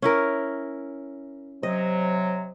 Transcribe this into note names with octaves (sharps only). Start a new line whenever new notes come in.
C#4 E4 A#4
C3 F#3 D#5